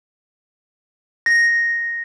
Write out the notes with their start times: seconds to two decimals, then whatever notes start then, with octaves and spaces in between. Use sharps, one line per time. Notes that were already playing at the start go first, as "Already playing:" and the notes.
1.26 A#6